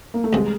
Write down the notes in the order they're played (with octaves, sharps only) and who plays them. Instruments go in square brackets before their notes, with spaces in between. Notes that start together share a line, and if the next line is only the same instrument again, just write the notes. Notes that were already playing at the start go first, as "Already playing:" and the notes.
[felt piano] A#3
A3
[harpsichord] C2 C3 E3 [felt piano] G#3